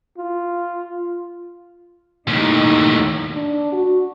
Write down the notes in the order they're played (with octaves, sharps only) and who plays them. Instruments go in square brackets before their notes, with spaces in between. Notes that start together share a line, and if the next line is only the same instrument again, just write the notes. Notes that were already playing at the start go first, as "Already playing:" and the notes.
[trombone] F4
[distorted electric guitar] D#2 A2 [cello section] D#4
[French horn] D4
F#4